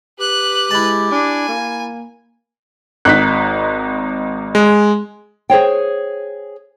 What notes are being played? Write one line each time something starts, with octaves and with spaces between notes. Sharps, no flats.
G4 B4 F#6
G#3 E4 A5
D4 G#5
A#3
G#1 D#4 F#6 B6
G#3
G#4 C5 C#5 G5